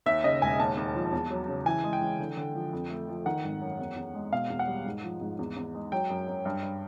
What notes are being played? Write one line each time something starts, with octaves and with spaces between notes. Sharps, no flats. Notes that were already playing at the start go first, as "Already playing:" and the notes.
D#2 E5
C#3 D#5
E1 G#5
D#2 A5
D#2
F3
E2
F#3
C#3
E3 G#5
G#3
G5
E3
D3
D3
F3
F2
A3
F3
D#3 F#5
G#1
F#2
E2
E2
G#3
B2 F5
E2
F#5
G3
G#2
F3
G#2
E2
E2
G#3
F#3 G5
F#2
F#2
G2
G2